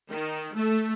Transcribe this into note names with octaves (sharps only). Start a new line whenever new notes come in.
D#3
A3